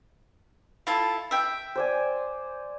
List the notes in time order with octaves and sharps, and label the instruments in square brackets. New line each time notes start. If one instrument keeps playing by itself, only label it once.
[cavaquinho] E4 F4 A4
E5 G5
[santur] C5 D5 G#5